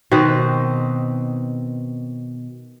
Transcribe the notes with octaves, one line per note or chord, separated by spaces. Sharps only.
B2 D#3 C4 B4